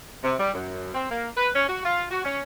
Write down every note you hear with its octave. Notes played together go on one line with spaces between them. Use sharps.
C3
G3
F#2
C4
A#3
B4
C#4
F#4
F4
F#4
C#4